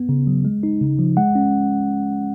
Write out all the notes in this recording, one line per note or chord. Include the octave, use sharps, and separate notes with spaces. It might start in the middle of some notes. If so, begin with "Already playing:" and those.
Already playing: B3
C#3
F#3
G#3
D#4
C#3
F3
G#3 F#5
C#4